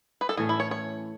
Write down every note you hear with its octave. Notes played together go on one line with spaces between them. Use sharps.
B4
A4
A2 E3 A3 C#4 G#4
E4
C#5
C#5